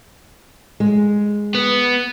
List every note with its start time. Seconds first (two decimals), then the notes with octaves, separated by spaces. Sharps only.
0.80 G#3
1.55 B3